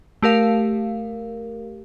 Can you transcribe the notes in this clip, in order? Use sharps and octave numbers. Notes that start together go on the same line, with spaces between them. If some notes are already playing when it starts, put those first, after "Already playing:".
A3 G4 A#4 F5